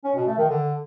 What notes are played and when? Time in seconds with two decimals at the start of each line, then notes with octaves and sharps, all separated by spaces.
0.04 C#4
0.15 B2
0.27 A3
0.38 D#3
0.49 D3